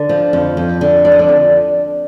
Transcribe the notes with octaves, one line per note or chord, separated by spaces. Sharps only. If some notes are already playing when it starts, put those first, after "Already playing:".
Already playing: D3
F3
F2
F2
D3
F3 D5
D#5
D4 D5
F2